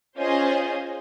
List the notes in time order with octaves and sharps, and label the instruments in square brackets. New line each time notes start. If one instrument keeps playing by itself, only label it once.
[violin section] C#4 F4 G#4 C5 D#5